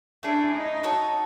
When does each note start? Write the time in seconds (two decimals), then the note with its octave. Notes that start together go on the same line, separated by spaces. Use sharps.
0.23 A3 C#4 D4 E4 G#4
0.54 D#4
0.83 F#4 A4 C#5